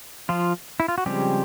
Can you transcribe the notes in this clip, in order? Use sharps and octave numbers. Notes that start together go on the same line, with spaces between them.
F3 F4
E4
F4
F#4
C#3 F3 G3 G#3 C4 G4